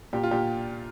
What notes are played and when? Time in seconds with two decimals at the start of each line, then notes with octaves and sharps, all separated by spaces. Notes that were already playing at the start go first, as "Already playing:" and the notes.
0.13 A#2 G4
0.23 F4
0.31 A#2 G4